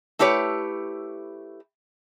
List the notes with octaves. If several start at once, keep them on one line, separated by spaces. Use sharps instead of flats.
A3 E4 G4 B4 C#5